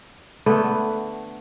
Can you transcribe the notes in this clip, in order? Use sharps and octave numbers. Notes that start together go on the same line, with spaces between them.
D3 A3 B3